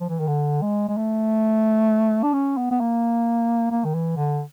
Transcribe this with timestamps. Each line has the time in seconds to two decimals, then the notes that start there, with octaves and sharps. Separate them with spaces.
0.01 F3
0.09 E3
0.19 D#3
0.27 D3
0.62 G#3
0.89 G#3
0.97 A3
2.23 D4
2.33 C#4
2.58 B3
2.71 B3
2.80 A#3
3.71 A#3
3.85 D#3
3.95 E3
4.17 D3